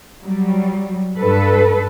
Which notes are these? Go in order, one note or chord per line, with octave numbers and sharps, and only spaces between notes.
F#3 G3
G2 A4 B4